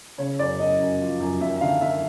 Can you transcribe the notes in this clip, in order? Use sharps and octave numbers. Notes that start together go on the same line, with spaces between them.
C#3 C#5
F#2 D5
F#2 D#5
F#2
F3
F#2
D#2 E5
D3 F5
D#2 E5